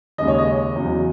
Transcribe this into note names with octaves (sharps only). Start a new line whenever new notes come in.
D#2 C#3 G#3 D#5
C#5
D#5
E2 C#3 F#3